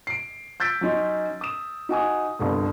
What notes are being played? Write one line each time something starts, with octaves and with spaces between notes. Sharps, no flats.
C7 D7
E6 G6 A6 B6 D7
F#3 C#4 D#4 C6
D#6 E7
D#4 F#4 G#5 D#6
G1 C2 D3